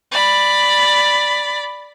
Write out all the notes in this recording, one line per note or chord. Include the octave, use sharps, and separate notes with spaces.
D5 B5